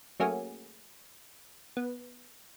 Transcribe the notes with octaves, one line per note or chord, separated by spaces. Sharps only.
F#3 A3 A#3 C#4 F#4 G#4
B3